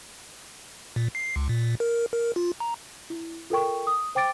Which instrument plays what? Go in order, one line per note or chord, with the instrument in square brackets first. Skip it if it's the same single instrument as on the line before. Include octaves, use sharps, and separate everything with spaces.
[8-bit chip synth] A#2
C7
C#2
A#2
A#4
A#4
F4
A#5
[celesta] E4
F4 A4 A#4 G5 C#6
D#6
C5 G5 D6 A6 D7